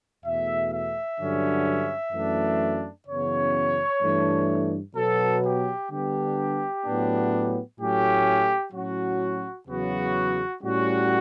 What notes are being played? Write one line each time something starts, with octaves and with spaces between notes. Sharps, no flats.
E2 B2 A3 E5
E5
G2 D3 F#3 C#4
F#2 E3 A3 D4
F#2 C#3 E3 B3 C#5
G2 E3 A3 D4
B2 F#3 B3 A4
G4
D3 G3 B3 D4 G4
A2 F#3 B3 D4
A2 F#3 A3 C#4 G4
A2 F#3 C#4 F#4
E2 C#3 F#3 B3 F#4
A2 G3 C#4 F#4